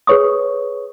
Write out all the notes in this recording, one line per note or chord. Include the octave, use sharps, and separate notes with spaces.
G#4 B4 C#5 C#6 D#6